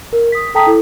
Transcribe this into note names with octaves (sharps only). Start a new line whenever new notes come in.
A#4
D#6 B6
A4 G5 A5 A#5 D#6 B6
E4 A4